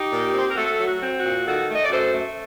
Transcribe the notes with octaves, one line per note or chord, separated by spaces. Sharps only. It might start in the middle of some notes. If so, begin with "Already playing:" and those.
Already playing: D#4 G4
A#2
C4
C5
A#4
A3 F#4 A4
F#3
F#4
C4
F#4
A#2
D#3 F#4 A4
A3 D#5
D5
F#2 A4 C5
A3